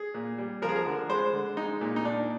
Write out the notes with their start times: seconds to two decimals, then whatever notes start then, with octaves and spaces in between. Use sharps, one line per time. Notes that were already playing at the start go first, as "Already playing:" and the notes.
Already playing: G#4
0.14 A#2
0.38 G3
0.62 F3 A#4
0.69 G#4
0.76 A#4
0.86 D3
1.09 G#3 C5
1.33 D3
1.57 G#3 D#4
1.81 A#2
1.96 D#4
2.05 A#2 D4